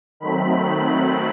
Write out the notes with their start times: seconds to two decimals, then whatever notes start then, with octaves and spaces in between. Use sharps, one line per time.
0.20 D#3 F#3 A3 C4 B5